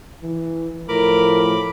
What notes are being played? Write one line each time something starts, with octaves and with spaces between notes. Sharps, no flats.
E3
A2 F3 A#4 B5 D6